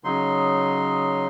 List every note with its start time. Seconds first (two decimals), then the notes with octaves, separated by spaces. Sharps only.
0.04 C#3 F#3 D#4 C6